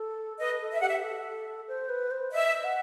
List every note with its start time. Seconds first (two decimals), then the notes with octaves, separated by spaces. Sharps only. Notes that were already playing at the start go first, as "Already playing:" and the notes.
Already playing: A4
0.39 B4 D#5
0.61 A4
0.72 E5
0.80 G4 F#5
0.88 E5
1.03 A4
1.68 C5
1.89 B4
2.11 C5
2.32 D#5 E5
2.64 F#5